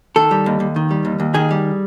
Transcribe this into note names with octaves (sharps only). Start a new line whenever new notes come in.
D#3 A4
G3
D#2
D#2
D#3
G3
D#2
D#2
D#3 G#4
G3